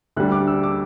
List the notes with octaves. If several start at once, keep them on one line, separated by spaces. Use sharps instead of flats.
D2 D3 G3 D4 F#6
D6
E6
D6